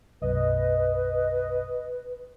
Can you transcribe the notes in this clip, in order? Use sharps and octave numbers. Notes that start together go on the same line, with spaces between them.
B1 F#2 B2 B4 D#5